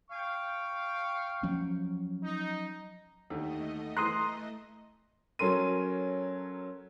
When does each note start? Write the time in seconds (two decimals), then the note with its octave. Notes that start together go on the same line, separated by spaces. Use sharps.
0.11 F5 G5 C#6
1.43 F3 F#3 C#4
2.23 D#4
3.30 D#2 D3 A3 D#5
3.97 E3 A#5 C6 D#6 F#6
5.39 F#3 C#4 A4 A#4 C6 D#7